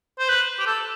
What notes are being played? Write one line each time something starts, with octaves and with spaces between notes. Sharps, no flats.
C5
B4
G4
A4